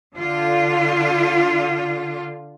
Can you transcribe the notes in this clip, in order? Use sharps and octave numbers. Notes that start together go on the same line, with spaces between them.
D3 F4